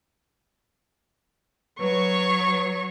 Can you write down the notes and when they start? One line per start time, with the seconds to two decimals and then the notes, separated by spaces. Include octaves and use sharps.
1.80 F#3 B4 C#5 C#6